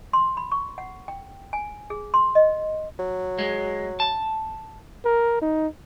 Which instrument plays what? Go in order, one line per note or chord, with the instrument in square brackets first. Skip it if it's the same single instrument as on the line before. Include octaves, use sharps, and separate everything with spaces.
[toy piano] C6
B5
C#6
F#5
G5
G#5
G#4
C6
D#5
[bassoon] F#3
[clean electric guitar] G#3
A5
[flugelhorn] A#4
D#4